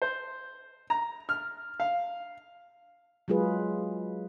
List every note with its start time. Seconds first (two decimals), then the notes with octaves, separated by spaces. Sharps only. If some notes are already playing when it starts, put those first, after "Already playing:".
0.02 C5
0.90 A#5
1.29 F6
1.80 F5
3.28 F#3 G#3 F4 G#4 B4